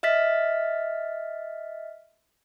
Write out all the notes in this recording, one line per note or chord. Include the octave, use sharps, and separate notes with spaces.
D#5 E5 F6 A6 B6